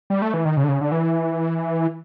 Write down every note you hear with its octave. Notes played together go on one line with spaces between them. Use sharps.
G3
A3
E3
D#3
C#3
D3
C#3
D3
E3